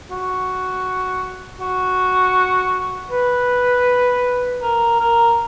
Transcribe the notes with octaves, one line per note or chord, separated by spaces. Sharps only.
F#4
F#4
B4
A#4
A#4